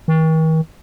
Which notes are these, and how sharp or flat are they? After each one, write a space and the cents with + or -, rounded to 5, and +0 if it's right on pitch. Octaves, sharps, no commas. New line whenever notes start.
D#3 +45